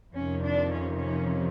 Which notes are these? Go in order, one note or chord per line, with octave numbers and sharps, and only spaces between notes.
F2 C3 D#3 C#4
D4
C#4
C#4